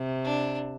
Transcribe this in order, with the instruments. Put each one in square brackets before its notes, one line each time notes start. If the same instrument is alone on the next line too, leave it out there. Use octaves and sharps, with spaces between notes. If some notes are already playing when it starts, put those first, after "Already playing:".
Already playing: [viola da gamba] C3
[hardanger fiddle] D4